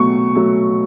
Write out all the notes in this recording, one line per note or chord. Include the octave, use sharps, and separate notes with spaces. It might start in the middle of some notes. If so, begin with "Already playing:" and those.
Already playing: B2 F#3 A3 C#6
F#3 A3